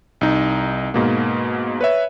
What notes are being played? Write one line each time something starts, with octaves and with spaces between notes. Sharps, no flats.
C2 D#4
G#2 B2 A#3
B4 C#5 E5